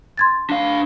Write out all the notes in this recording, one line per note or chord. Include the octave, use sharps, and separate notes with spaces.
C6 G#6 A6
D4 F5